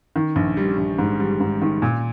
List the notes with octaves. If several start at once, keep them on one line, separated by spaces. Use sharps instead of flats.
D#3
A#1
G3
A#1
G#2
G3
G#2
D#3
A#2